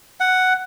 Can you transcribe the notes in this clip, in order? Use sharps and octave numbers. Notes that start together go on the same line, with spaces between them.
F#5